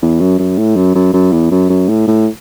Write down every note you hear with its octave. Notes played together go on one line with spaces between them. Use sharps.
E2
F#2
F#2
A2
F#2
F#2
F#2
E2
F#2
F#2
A2
A2